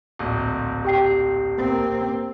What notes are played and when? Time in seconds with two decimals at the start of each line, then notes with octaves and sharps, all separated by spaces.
0.19 D1 A#1
0.85 G4 G5 C7
1.57 A#3 C4